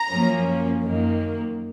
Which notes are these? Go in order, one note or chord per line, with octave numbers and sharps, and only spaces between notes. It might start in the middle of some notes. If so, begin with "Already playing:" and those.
Already playing: A#5
F#2 F3 A#3 C#4
F#2 D#3 A#3